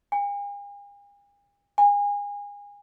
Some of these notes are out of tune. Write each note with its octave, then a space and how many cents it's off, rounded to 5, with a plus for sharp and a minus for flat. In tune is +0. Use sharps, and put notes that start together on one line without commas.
G#5 -45
G#5 -30